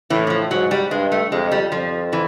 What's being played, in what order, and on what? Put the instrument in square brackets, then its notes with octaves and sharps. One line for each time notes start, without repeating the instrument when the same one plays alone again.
[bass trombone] A2 [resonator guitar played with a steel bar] E3
[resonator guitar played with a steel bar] E3
F3
[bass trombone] G#2 [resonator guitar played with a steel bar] F#3
[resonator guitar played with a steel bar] G3
[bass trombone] G2 [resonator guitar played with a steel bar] G#3
[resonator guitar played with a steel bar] A3
[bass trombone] F2 [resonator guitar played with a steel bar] G#3
[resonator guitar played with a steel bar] G3
[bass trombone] F2 [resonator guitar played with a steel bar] F3
[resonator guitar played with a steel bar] E3